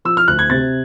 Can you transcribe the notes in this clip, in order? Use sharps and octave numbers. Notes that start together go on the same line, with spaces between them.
F3 E6
F6
D2 F#6
G#6
C3 A6